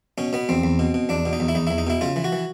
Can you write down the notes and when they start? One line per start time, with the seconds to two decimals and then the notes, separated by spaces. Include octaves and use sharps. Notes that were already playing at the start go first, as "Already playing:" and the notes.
0.18 B2 C#4
0.33 B2 B3
0.49 E2 C4
0.64 E2
0.79 B2
0.94 B2
1.09 E2 D4
1.25 B2
1.33 D#4
1.40 E2
1.48 E4
1.55 E2 D#4
1.67 E2 E4
1.78 D#4
1.87 B2 E4
2.01 C#3 F4
2.16 E3
2.24 F#4
2.32 E3